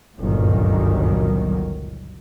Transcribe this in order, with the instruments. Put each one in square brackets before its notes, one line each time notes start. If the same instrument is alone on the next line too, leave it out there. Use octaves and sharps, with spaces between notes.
[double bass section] G1 C#2 F#2 A#2 D#3 F#3